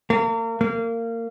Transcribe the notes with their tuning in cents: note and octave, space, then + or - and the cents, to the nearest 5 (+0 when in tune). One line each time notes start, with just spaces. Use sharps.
A#3 -35
A#3 -25